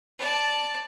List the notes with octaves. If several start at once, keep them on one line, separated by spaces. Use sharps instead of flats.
D5 A5